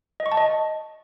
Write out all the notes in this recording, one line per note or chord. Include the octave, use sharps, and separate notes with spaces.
D#5
C#6
A5
D#5